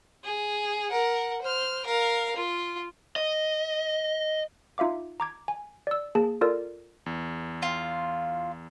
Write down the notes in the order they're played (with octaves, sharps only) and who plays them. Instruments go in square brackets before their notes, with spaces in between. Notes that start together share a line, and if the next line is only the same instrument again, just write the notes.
[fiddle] G#4
A#4 F#5
C5 F6
A#4 F5
F4
[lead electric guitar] D#5
[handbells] D#4 F4 E5 F5 D6
A#5 D6 G#6
G#5
D5 E6
A#3 G#4 A5
F4 A4 A#4 D5
[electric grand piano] E2
[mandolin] F4